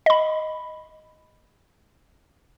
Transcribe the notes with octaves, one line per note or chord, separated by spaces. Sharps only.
D#5 B5